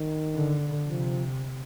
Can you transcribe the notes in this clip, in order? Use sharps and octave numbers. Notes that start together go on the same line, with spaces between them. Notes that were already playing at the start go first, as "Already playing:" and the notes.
Already playing: D#3
D3
C3 F3